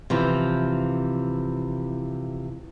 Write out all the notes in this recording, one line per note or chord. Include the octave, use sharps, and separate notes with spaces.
C3 E3 F3